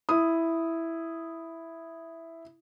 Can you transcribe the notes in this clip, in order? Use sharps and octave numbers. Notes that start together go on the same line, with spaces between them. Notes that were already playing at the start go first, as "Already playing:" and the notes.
E4 D#6